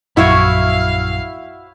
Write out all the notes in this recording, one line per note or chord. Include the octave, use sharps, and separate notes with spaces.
A#1 F#2 E4 F#4 C#5 F5 C#6